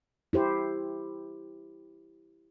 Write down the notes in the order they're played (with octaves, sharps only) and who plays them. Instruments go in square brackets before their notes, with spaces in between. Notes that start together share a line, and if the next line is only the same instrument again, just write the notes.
[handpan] E4 G4 C5